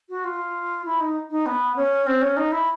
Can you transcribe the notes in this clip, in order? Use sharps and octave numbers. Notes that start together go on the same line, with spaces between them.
F#4
F4
E4
D#4
D#4
B3
C#4
C4
C#4
D#4
E4